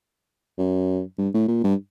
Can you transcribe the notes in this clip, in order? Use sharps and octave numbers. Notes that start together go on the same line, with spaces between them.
F#2
G2
A2
A#2
G2